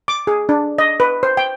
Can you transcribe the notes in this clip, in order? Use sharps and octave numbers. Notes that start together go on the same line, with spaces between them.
D6
G#4
D4
D#5
B4
C5
G5